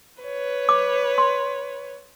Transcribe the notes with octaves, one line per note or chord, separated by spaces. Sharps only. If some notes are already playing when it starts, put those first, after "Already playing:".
B4 C#5
D6
C6